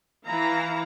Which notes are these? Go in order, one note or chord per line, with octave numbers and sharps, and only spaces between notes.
E3 E4 F5 A#5